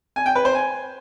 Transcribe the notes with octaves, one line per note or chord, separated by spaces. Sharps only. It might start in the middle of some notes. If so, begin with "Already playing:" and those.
G#5
G5
B4
C5
G#5